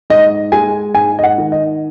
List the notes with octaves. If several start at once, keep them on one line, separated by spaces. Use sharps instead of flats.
G#2 D#5
G#3 G#5
G#2 G#5
D#5
F#5
D#3
D#5